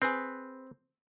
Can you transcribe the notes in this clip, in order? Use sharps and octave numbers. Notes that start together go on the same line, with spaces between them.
C4 G#4 B4